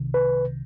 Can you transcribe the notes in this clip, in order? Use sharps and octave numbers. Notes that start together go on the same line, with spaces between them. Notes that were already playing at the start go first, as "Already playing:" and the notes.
Already playing: C2 C3 D#3
B4